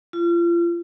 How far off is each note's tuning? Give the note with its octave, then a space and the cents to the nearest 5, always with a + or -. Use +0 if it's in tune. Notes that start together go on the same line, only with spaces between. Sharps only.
F4 -35